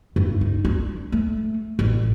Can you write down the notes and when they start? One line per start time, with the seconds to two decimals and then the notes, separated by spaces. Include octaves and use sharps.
0.16 G2
0.41 D#4
0.65 D4
1.12 A3
1.79 A1